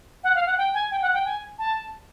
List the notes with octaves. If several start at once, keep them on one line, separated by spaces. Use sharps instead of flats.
F#5
F5
F#5
G5
G#5
G5
F#5
G5
G#5
A5